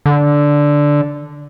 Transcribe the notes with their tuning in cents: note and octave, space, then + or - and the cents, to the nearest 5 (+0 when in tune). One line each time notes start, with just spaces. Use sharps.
D3 -5